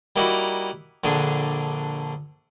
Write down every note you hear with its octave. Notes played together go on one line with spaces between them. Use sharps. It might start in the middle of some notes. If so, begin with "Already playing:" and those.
G3 A#3 D#4 E4 F#4
A#1 D3 D4 G#4